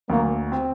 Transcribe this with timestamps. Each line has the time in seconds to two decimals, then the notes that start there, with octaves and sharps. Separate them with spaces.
0.09 D2 A#3
0.52 C4